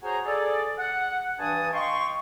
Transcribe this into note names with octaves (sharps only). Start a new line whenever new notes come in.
F#4 G#4 C5 C#5 G#5 A#5
G#4 A4 D5
F#5
G2 E3 D4 G#5 A5 D#6
D#5 F5 G5 C6 C#6